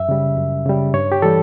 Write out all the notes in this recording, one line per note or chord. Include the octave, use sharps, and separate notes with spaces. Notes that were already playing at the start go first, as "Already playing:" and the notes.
Already playing: F#2 E5
C#3 G3
F#2
C#3 G3
G2 C#5
G4
E3 G3 A4